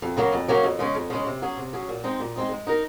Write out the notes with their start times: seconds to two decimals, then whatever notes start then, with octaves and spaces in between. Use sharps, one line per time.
0.02 F2
0.17 C#3 F#3 A#3 C#4
0.33 F2
0.48 C#3 F#3 A#3 C#4
0.63 F2
0.79 C#3 G#3 C#4
0.95 F2
1.10 C#3 G#3 C#4
1.27 C3
1.42 F#3 C#4 G#4
1.57 C3
1.73 F#3 C#4 G#4
1.89 A#2
2.04 G#3 C4 D#4
2.20 A#2
2.35 G#3 C4 D#4
2.51 G#3
2.67 D#4 A#4